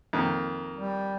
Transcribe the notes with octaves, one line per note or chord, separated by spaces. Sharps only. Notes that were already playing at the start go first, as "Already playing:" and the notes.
F2 D#3 A#3
G3